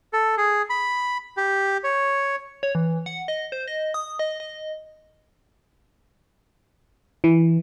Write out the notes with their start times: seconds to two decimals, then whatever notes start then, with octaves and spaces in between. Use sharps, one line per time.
0.13 A4
0.38 G#4
0.70 B5
1.37 G4
1.84 C#5
2.63 C#5
2.75 E3
3.06 F#5
3.28 D#5
3.52 C5
3.68 D#5
3.94 D#6
4.19 D#5
4.40 D#5
7.24 E3